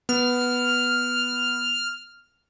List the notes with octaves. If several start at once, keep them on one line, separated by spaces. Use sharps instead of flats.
B3 F6